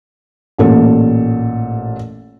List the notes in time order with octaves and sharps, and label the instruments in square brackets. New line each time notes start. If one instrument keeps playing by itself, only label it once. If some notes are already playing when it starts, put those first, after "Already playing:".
[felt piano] A1 A#2 A4